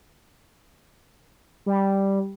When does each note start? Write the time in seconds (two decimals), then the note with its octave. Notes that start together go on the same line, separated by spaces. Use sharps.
1.66 G3